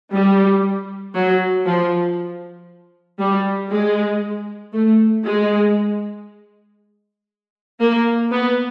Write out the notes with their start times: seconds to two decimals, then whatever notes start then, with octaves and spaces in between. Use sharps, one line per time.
0.13 G3
1.15 F#3
1.65 F3
3.19 G3
3.70 G#3
4.73 A3
5.24 G#3
7.80 A#3
8.31 B3